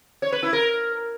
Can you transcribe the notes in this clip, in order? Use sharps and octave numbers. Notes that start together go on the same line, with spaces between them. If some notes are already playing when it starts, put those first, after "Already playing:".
C#5
B4
E4
A#4